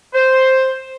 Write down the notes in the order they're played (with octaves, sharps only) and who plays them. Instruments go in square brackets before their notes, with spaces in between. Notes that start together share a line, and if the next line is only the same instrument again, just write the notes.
[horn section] C5